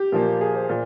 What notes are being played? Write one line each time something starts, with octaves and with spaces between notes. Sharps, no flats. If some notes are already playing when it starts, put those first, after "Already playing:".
Already playing: G4
A#2 F3 A#3
G#4
C5
A#2